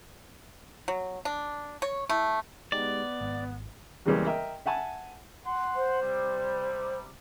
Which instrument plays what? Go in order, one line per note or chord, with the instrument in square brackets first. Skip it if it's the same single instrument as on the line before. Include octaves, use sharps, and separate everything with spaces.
[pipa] F#3
D4
C#5
A3 E4
[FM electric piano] G#3 D#4 G4 [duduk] B3 [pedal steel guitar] D5
[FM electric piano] G#1
[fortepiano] E2 C#3 E3 G3 G#3 A#3
A#4 D#5 E5 G5
E5 F#5 G#5 A5
[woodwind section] F#5 C6
[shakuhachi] C5
[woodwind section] C3 G3